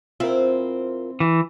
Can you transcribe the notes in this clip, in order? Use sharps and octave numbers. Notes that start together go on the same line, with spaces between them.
C4 E4 F4 A#4
E3